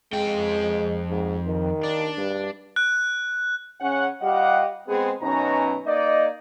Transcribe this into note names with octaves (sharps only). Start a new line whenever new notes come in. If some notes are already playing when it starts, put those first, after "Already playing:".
F2 G#3 G5
G#2
D#3
D4
G2
F#6
C#3 C#4 F#5
G3 F4 G4 D#5 F5 F#5
G#3 B3 C4 G#4
F#2 B2 C#4 D#4 B4 A#5
A#3 D#4 D5 D#5